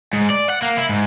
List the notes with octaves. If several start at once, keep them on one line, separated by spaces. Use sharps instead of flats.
G#2
D5
F#5
A#3
E4
G#2